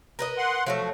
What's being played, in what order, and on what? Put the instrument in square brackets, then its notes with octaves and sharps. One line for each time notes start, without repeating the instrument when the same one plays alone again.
[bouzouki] A#4 B4 D#5
[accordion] F#5 C6
[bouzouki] F3 F#3 F#4 [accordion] A3